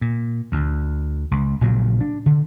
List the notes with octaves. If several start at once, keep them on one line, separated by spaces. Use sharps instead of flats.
A#2
D2 D3
C#2
A#1 A#2 C#3 F#3
D4
D3